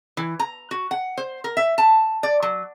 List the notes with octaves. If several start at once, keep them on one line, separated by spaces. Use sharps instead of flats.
E3
A#5
F#4
F#5
C5
A#4
E5
A5
D5
F#3